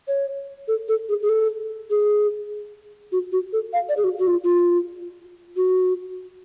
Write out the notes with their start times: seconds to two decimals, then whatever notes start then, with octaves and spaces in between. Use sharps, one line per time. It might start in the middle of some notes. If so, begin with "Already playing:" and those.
0.08 C#5
0.68 A4
0.88 A4
1.09 G#4
1.22 G#4
1.29 A4
1.90 G#4
3.12 F#4
3.32 F#4
3.53 A4
3.73 F5
3.89 D5
3.97 G#4
4.04 F#4
4.19 F#4
4.27 F4
4.44 F4
5.56 F#4